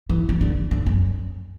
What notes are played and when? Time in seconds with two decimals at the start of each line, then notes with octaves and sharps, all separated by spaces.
0.09 E3
0.29 C#3
0.41 D3
0.71 D3
0.86 F#2